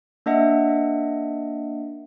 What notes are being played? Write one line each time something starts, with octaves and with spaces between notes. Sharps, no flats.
A#3 D4 D#5 E5 F#5